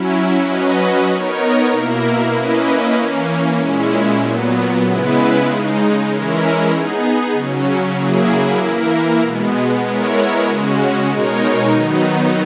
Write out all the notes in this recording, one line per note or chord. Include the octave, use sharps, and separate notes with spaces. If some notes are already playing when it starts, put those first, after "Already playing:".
Already playing: F#3 C#4 E4
F#3 C#4 F#4 B4 D#5
B3 D#4 A#4 C#5
B2 A#3 E4 A#4
A#3 C#4 E4 B4 D#5
E3 A#3 C#4
A#2 G#3 C#4 E4
A#2 F#3 B3
C#3 G#3 B3 E4 B4
C#3 G#3 D#4
E3 G#3 C#4 E4 A#4
B3 D#4 G#4
C#3 F#3 C#4
C#3 F#3 A#3 E4 G#4
E3 A#3 E4 A#4
B2 G#3 B3
G#3 B3 E4 A#4 C#5
C#3 G#3 C#4 F#4
B2 G#3 D#4 A#4 C#5
D#3 F#3 B3 D#4